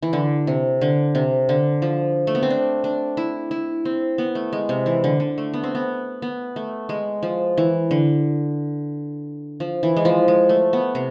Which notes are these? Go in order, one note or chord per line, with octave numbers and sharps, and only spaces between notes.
E3
D3
C3
D3
C3
D3
F3
A3
B3
C4
D4
D4
E4
E4
C4
B3
A3
G#3
C3
E3
D3
D3
A3
B3
C4
B3
B3
A3
G#3
F3
E3
D3
F3
E3
G#3
F3
G#3
A3
B3
C3